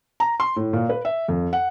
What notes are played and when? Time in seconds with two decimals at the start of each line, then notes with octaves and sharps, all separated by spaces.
0.20 A#5
0.40 C6
0.56 A2
0.73 A#2
0.89 B4
1.05 E5
1.28 F2
1.53 F#5